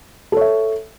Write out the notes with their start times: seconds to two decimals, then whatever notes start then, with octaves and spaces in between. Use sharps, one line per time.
0.32 A4
0.37 C#5
0.41 E5